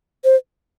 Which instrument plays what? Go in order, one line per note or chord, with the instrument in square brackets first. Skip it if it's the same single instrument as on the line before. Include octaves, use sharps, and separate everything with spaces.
[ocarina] C5